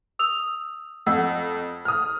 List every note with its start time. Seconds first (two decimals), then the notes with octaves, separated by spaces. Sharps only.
0.19 D#6 E6 F7
1.06 F2 F#5 E6
1.85 D#6 F6